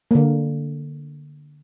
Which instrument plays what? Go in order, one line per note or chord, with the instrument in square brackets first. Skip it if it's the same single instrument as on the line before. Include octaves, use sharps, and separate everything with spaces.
[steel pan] D3 A#3